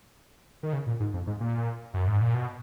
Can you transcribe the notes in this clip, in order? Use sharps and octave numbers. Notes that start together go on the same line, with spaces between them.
D#3
C#3
A#2
G#2
F2
G#2
A#2
F#2
G#2
A#2
B2